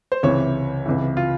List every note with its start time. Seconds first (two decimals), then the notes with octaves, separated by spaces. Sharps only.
0.12 C5
0.23 C#2 C3 E3 C#5
0.86 C#2 C3 E3
1.17 F4